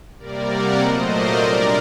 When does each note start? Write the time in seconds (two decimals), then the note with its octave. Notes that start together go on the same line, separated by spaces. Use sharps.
0.18 C3 G3 A#3 A#4 D5
0.50 D5 F#5
0.80 A#2 F#3 A3 C5 D#5
1.10 A#4 D5
1.41 C3 G3 D4